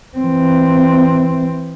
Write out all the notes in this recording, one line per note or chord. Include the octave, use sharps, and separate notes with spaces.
E3 C4